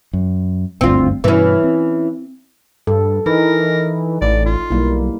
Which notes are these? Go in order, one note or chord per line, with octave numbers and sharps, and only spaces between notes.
F#2
F#1 D2 G2 C4 F4
G2 B2 E3 C#4
C4
G2 A4
E3 D#4 A#4
A1 D5
F4
B1 G3 A#3 E4